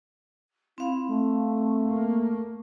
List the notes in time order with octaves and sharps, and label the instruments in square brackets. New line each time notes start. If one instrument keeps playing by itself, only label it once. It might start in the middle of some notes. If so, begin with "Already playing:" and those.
[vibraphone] C4 F5 [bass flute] E4
[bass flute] A3
[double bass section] A#3